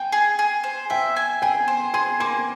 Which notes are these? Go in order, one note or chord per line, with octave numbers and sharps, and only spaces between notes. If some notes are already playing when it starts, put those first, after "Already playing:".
Already playing: G5 G#5
G#4
G#4
C5
E5 G5
G#5
G#4 G5
C5
G#4 C6
A#3 C6